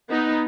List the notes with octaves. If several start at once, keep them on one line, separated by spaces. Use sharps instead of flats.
B3 D#4